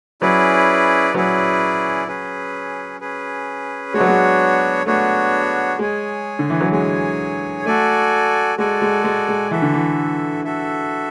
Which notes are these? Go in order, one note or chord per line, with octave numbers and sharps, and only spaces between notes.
F#3 C#4 E4 G#4 B4 D5
F#3 C#4 E4 G#4 B4 D5
C#4 G#4 B4
C#4 G#4 B4
G#3 B3 D4 F#4 C#5
F#3
G#3
A3 B3 D4 F#4 C#5
G#3 G#4 C#5 G#5
D3
E3
F#3
G#3 G#4 C#5 G#5
A3 F#4 A4 D5 G#5
G#3 F#4 A4 D5 G#5
G#3
G#3
G#3
E3 F#4 A4 E5
D3
E3
F#4 A4 E5